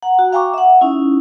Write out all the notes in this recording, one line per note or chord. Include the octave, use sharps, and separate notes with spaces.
F#5 A#5
F#4
F5 G5 G#5 A#5 C#6 D6
E5 F#5
C#4 D#4 E4